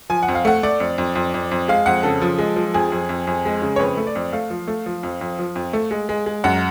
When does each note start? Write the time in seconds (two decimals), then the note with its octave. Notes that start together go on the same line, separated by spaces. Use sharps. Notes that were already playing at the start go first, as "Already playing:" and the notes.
0.10 F3 G#5
0.23 F#5
0.28 F2
0.35 F5
0.45 A3 F#5
0.63 A3 D5
0.80 F2
0.98 F2
1.15 F2
1.34 F2
1.51 F2
1.68 G#3 F5
1.86 F2 F#5
2.03 C#3 A4
2.22 F3
2.38 G#3
2.56 F3
2.74 F2 G#4
2.92 F2
3.09 F2
3.27 F2
3.45 G#3
3.62 C#3
3.76 C#5
3.79 F2 B4
3.97 A3
4.07 D5
4.15 F2
4.33 A3 F5
4.50 F3
4.68 A3
4.86 F3
5.03 F2
5.21 F2
5.39 F3
5.56 F2
5.73 A3
5.91 G#3
6.09 G#3
6.26 G#3
6.44 F#2 F#5